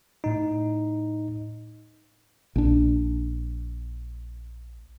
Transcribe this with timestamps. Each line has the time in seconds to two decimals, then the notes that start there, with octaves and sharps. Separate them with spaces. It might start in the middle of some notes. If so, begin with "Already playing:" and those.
0.24 A2 D#4
2.56 A#1 D4